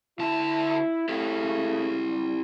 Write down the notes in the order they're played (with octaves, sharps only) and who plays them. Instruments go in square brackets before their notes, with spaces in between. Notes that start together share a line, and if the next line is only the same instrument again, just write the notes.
[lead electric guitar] D2 A5 [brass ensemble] E4
[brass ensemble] C#3 A3 [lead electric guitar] E4 G4
[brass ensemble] G3